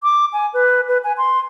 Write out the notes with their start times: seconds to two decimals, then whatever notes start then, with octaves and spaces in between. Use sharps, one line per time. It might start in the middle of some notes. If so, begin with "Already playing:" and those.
0.03 D6
0.33 G#5
0.54 B4
0.89 B4
1.04 G#5
1.18 C6